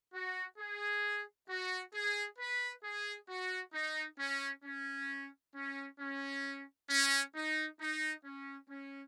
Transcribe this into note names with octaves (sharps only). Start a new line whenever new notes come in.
F#4
G#4
F#4
G#4
B4
G#4
F#4
D#4
C#4
C#4
C#4
C#4
C#4
D#4
D#4
C#4
C#4